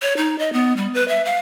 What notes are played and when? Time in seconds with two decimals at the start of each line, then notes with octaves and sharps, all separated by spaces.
0.02 C#5
0.17 D#4
0.39 D#5
0.53 B3
0.77 G3
0.94 B4
1.08 E5
1.25 F5